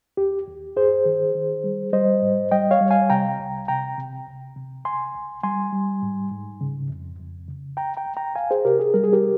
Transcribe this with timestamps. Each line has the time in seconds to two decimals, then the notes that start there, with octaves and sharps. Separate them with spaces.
0.17 D#2 G4
0.48 D#2
0.76 G2 G#4 C5
1.05 D#3
1.35 D#3
1.64 G3
1.93 G3 C5 D#5
2.22 G#2
2.51 G3 D#5 G5
2.71 C#5 F5
2.81 G3
2.91 F5 G#5
3.10 C3 G5 A#5
3.39 C2
3.68 C3 G5 A#5
3.98 C3
4.27 C#2
4.56 C3
4.85 C#2 G#5 C6
5.14 C#2
5.43 G3 G#5 C6
5.73 G3
6.02 G#2
6.31 G#2
6.61 C#3
6.90 F2
7.19 F2
7.48 C#3
7.77 C#2 G5 A#5
7.97 G5 A#5
8.07 C#2
8.17 G5 A#5
8.35 C#2 F5 G#5
8.51 G#4 C5
8.65 C3 G4 A#4
8.79 G#4
8.94 G3 A#4
9.04 G#4
9.13 G4 A#4